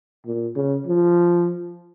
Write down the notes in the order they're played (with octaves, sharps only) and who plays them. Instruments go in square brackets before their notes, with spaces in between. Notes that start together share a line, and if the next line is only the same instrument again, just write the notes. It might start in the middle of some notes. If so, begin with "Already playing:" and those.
[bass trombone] A#2
C#3
F3